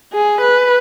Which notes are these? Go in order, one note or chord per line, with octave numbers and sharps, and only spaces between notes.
G#4
B4